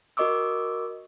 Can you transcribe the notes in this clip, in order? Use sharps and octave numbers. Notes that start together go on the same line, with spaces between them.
F#4 A#4 D#5 C#6 D6 E6